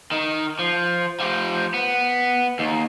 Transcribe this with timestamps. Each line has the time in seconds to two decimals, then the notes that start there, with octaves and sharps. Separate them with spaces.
0.11 D#3
0.59 F3
1.20 F3 G4
1.74 B3
2.59 D#2